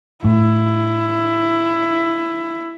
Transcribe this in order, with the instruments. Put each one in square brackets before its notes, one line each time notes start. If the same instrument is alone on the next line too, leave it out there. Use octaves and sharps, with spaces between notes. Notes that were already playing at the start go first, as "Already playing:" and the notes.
[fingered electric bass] A2 [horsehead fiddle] E4